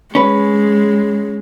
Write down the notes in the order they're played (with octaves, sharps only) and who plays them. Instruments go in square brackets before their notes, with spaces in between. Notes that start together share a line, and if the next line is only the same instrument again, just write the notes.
[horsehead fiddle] G#3 [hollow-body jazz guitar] C#4 B4